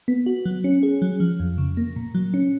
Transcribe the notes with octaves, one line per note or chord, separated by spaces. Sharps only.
B3
F#4
F#3
C#4
G#4
F#3
F3
F2
C#3
A#3
A#2
F#3
C#4